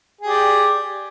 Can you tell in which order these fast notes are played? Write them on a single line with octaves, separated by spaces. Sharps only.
G#4 G4 D5